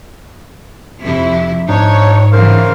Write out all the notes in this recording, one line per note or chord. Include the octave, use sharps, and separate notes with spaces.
F2 C3 E4
G#2 D4 D#4 C#5
C#3 E3 A#4 C5 F5